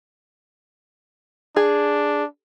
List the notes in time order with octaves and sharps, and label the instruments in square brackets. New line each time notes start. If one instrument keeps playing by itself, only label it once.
[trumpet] D4 [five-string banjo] G#4